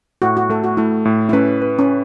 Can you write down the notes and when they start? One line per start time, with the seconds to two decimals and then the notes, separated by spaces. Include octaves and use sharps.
0.22 A2 F#4
0.37 F#4
0.50 A3 A4
0.64 F#4
0.77 A3 E4
1.05 A2
1.29 E4
1.33 C#4 B4
1.62 B4
1.79 C#4